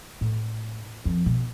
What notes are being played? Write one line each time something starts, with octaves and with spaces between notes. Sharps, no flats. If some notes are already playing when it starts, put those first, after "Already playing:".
A2
F2
B2